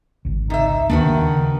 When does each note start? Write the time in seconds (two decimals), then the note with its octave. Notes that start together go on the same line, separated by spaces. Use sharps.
0.25 G#1 C#2
0.50 C3 D#4 E5
0.90 D#2 D#3 A#3 D4 F#4 B4
1.04 C#3